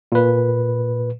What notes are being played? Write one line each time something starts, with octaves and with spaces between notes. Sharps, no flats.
A#2 B4